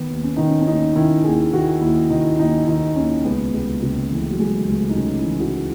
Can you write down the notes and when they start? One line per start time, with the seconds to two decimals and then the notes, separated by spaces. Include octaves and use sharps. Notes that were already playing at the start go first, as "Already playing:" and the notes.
Already playing: D#3 B3
0.10 D#2
0.24 C#4
0.37 D#3 D#4
0.49 C#4
0.61 C#4
0.67 D#2 D#4
0.95 D#3 E4
1.24 D#2 G#4
1.53 D#3 F#4
1.81 D#2 E4
2.10 D#3 D#4
2.39 D#2 D#4
2.68 D#3 D#4
2.96 D#2 C#4
3.25 C#2 B3
3.54 C#2
3.82 C#3
4.11 E3 A3
4.31 F#3
4.40 C#2 G#3
4.68 C#2 A3
4.90 D#4
4.97 C#3 C#4
5.19 E4
5.26 E3
5.40 F#4